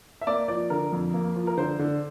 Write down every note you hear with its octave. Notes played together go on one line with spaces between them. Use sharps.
E5
A#3 D5
F3 D5
D3 A#4
F2
A#3
F3
A#4
D3 C5
D3